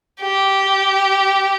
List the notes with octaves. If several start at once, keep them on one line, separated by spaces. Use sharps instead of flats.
G4